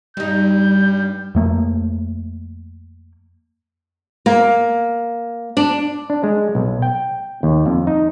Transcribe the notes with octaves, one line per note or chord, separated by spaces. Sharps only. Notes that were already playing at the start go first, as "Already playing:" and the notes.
G2 G3 D#4 G6
F2 A3 A#3
A#3
D4
D4
G#3
B1
G5
D#2
F2
D#4